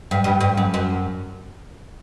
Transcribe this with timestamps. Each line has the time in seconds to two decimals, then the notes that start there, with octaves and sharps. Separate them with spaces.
0.11 G2
0.24 G2
0.40 G2
0.57 F#2
0.74 F#2